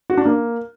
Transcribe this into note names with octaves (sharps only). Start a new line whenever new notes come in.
F#4
D4
A#3